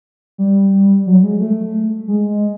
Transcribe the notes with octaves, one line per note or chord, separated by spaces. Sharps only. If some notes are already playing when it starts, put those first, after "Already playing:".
G3
F#3
G#3
A3
G#3